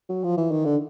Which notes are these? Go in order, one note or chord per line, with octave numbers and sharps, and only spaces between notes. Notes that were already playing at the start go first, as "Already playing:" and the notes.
F#3
F3
E3
D#3
D3